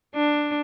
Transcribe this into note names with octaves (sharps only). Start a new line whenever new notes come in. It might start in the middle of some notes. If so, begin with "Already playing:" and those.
D4